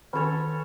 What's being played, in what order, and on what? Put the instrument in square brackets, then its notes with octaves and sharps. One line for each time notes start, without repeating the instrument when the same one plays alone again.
[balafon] D#3 [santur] C#4 A4 C#5